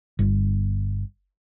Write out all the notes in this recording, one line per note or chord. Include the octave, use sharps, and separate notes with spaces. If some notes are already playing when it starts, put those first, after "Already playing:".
G1